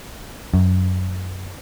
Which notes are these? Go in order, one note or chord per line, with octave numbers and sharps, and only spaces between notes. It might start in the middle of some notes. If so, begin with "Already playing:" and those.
F#2